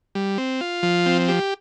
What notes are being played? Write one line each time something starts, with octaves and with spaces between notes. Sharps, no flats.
G3
C4
F4
F3
C4
G4